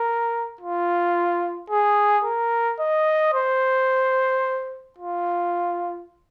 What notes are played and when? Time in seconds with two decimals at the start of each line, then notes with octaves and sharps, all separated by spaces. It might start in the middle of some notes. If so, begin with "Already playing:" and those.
Already playing: A#4
0.61 F4
1.70 G#4
2.24 A#4
2.79 D#5
3.34 C5
4.98 F4